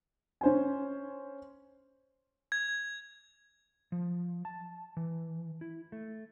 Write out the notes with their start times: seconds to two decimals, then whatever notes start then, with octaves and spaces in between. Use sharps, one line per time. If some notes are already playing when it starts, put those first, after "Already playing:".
0.41 C#4 C5 G#5
2.52 G#6
3.92 F3
4.45 A5
4.97 E3
5.61 E4
5.92 A3